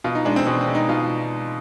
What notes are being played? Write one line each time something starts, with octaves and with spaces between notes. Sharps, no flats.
B2 F4
D#4
G#3 D4
C4
B2 C4
C4
G#3
D#4
B2 F4